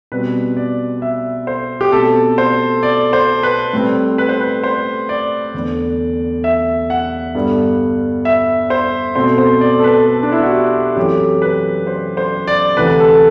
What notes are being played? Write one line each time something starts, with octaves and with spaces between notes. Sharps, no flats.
B2 G3 C4 B4
D5
E5
C5
G4
B2 A3 C4 A4
C5
D5
C5
B4
A2 G3 C4
B4
C5
B4
C5
D5
E2 D3 A3
E5
F#5
G2 D3 G3 B3
E5
C5
B2 A3 C4 C5
C5
D5
A4
B4
A4
D4
E4
F#4
G4
F#2 E3 A3 C4 G4
B4
C5
C5
D5
D2 C3 E3 A3 B4
A4